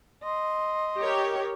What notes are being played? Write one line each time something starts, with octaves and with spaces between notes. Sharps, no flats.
D#5 C6
G4 A#4 C#5